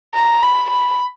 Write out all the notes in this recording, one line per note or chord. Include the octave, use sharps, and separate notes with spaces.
A#5
B5
B5